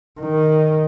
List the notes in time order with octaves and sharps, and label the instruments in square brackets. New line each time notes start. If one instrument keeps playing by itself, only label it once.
[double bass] D#3